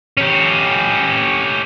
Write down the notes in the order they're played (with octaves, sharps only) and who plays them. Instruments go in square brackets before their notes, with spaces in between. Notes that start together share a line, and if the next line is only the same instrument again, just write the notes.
[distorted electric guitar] C#4 G4